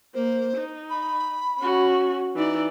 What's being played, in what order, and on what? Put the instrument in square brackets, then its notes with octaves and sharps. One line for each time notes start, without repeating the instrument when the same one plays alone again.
[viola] A#3 [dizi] C5
[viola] D#4
[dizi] B5
[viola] C#4 F#4
[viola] E3 D5 [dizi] D#4